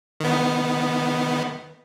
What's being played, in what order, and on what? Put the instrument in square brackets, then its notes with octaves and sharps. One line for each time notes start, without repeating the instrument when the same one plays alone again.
[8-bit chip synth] D#3 B3